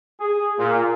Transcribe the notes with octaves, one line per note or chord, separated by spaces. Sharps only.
G#4
A#2